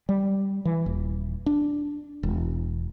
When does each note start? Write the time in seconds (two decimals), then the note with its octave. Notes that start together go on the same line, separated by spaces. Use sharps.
0.09 G3
0.65 E3
0.86 D#1
1.46 D4
2.23 E1